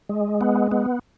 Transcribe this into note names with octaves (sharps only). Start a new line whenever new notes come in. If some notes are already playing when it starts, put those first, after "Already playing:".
G#3
B3
B3